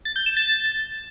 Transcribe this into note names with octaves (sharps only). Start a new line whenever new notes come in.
A6
G6
E7
A6